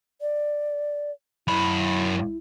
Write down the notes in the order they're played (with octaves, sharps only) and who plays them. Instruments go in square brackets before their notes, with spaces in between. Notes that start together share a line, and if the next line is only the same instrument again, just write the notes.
[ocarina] D5
[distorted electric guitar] F#2 B5 [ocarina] E4